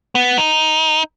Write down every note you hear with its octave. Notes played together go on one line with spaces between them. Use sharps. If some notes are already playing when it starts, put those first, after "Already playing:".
B3
D#4